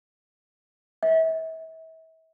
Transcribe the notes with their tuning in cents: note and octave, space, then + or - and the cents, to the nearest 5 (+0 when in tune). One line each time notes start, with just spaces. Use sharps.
E5 -35